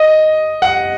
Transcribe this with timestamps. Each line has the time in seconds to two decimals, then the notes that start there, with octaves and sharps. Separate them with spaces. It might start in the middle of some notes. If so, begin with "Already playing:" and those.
Already playing: D#5
0.62 F#5